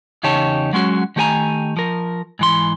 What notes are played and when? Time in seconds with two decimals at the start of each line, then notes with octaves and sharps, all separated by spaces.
0.23 E2 C#3 D#4 G4 C#5 A5
0.73 F#3 G#3 C#4 F#4
1.16 D#3 A3 G4 A#4 G#5 A#5
1.77 F3 A#4
2.39 G#2 E3 C6